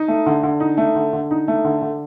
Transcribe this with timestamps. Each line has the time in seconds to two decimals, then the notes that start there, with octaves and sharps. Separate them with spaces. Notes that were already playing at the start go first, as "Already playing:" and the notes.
Already playing: D#4
0.08 A3
0.26 D3
0.43 D3
0.60 D#4
0.77 A3
0.96 D3
1.13 D3
1.31 D#4
1.48 A3
1.65 D3
1.82 D3